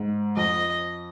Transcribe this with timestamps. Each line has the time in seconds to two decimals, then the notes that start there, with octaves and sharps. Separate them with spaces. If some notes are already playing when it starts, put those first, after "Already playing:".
Already playing: G#2
0.37 F2 D#5